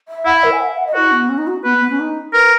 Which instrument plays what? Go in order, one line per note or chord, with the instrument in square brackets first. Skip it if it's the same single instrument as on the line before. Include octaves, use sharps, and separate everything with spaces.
[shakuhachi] E5
[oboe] E4 [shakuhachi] F#5
[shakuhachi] E5
A#4
G#5
F#5
E5
F#5
D#5
[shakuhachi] E4 [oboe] F#4
[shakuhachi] B3
C#4
D#4
F#4
[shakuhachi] B3 [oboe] B4
[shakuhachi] B3
C#4
D#4
[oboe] A#4 [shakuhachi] B4